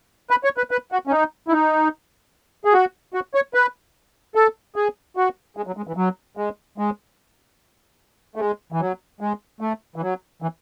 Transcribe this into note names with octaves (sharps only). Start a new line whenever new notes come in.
B4
C#5
B4
B4
F#4
C#4
D#4
E4
D#4
G#4
F#4
F#4
C#5
B4
A4
G#4
F#4
G#3
F#3
G#3
E3
F#3
G#3
G#3
A3
G#3
E3
F#3
G#3
A3
E3
F#3
E3